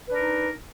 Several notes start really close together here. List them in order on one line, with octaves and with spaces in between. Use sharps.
B4 D4 A#4 D#4